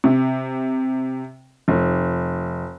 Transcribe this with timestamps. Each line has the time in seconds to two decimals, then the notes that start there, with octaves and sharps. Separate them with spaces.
0.04 C3
1.68 F1